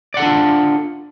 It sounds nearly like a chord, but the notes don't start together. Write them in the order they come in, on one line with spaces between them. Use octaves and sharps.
D5 F#5 A4 D4 F4